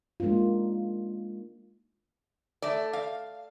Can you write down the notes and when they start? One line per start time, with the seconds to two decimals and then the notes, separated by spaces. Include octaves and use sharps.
0.20 G#3 A#3 D4 D#4 F4
2.62 A3 D5
2.93 F5